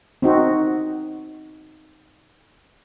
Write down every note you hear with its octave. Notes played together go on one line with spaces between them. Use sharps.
C4 D#4 F#4